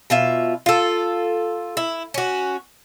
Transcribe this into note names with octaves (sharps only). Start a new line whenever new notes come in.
B2 F4 E5
F4 A4
E4
C#4 F#4